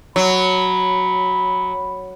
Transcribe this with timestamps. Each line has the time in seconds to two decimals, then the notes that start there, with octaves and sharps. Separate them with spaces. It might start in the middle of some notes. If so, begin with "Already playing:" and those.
0.16 F#3 B5